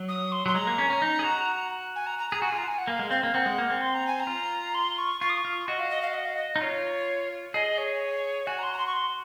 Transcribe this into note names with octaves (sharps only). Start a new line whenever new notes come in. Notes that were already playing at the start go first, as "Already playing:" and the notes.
Already playing: F#3
D#6
C6
F#3 C6
G#3 A#5
A#3
C#4
C#4
D#4
G#4
F#4
G#5
A#5
A#5
G#4 A#5
F#4 G#5
F4
A#5
G#5
F#5
A#3 F5
G#3
C4 F5
A#3
C4 F#5
G#3
A#3
C4
C6
A#5
G#5
A#5
F4
C6
C#6
F4 C#6
D#6
C#6
F4
F#4 D#5
F5
D#5
F5
D#5
F5
D#5
D#4
F4 C#5
G#4 D#5
C#5
F#4 G#5
A#5
C6
A#5
C6
C#6
C6